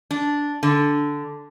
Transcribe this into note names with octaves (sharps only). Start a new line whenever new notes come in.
D4
D3